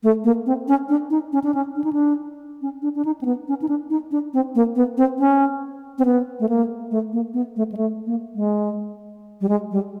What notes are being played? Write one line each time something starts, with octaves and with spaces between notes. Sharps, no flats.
A3
A#3
C4
C#4
D4
D#4
C#4
D4
C#4
D4
D#4
D4
C#4
D4
D4
D#4
C4
B3
C#4
D#4
D4
D#4
D4
C4
A#3
B3
C4
C#4
C4
B3
A3
A#3
A3
A#3
B3
A3
G#3
A3
A#3
G#3
G3
G#3
G3